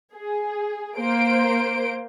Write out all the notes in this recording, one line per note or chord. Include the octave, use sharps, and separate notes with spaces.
G#4
A#3 C5 D7